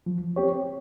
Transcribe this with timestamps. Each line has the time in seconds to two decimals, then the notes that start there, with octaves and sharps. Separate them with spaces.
0.06 F3
0.36 C4 G4 C#5